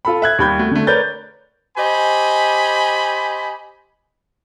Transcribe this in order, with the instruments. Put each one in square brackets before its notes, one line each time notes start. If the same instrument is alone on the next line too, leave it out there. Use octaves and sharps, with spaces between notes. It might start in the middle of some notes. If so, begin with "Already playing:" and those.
[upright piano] F4 A4 B5
E5 F#6 G#6
D#2 G3 B5 G6 G#6
A3 F#4
D3 A3
A#4 B4 C#5 D5 G6 A6
[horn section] G4 C5 D#5 G#5 B5